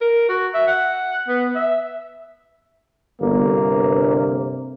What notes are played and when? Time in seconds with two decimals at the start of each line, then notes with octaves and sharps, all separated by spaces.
0.01 A#4
0.29 F#4
0.54 E5
0.67 F#5
1.28 B3
1.55 E5
3.21 G1 C3 A#3